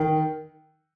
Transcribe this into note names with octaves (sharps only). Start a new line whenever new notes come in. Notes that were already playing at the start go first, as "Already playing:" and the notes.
Already playing: D#3